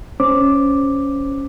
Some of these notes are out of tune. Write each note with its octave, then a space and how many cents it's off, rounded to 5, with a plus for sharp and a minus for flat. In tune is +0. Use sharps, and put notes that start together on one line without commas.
C#4 +0 C5 -10 D6 +0